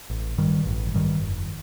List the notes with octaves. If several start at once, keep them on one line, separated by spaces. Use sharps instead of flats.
A1
G2 D#3 G3
A1
G2 D#3 G3
F1